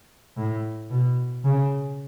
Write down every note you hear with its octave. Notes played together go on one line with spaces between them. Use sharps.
A2
B2
C#3